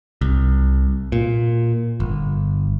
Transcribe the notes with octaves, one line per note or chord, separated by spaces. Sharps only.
C2
A#2
G1